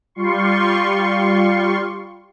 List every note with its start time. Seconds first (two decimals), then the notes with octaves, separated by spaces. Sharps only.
0.15 G3 F4 C6 C#6